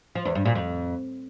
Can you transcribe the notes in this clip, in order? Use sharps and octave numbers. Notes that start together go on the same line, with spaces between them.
F3
E2
G2
A#2
F2